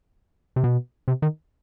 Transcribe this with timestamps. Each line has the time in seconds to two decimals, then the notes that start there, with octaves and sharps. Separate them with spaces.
0.56 C3
0.64 B2
1.08 C3
1.22 D#3